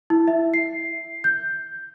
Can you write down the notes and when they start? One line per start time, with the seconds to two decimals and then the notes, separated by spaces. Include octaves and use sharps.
0.10 E4
0.28 E5
0.54 C7
1.24 G6